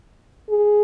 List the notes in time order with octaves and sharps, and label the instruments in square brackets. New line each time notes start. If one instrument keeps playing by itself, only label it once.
[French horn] G#4